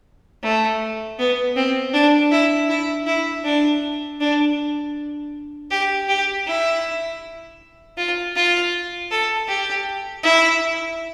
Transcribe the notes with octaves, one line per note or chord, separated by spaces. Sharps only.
A3
B3
C4
D4
E4
E4
E4
D4
D4
G4
G4
E4
F4
F4
A4
G4
E4